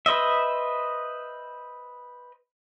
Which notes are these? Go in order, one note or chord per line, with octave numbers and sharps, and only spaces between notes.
B4 C5 D#5 E5